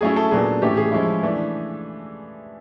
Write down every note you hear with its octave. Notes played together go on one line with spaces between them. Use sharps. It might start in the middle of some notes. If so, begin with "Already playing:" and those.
F#3 A3 C#4 E4 G#4
A4
A#2 F#3 B3 D4 G#4
A2 E3 A3 C#4 G4
G#4
F3 G#3 C#4 E4
E3 A3 D4